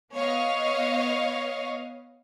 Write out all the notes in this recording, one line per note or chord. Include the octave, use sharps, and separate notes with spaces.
B3 C#5 D#5 F5